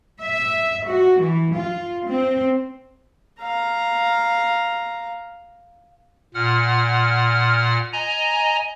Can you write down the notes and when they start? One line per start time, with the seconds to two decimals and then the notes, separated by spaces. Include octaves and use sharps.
0.20 E5
0.89 F#4
1.22 E3
1.55 F4
2.08 C4
3.41 F5 A#5
6.34 A#2 F#5 F6
7.93 D#5 G#5 A#5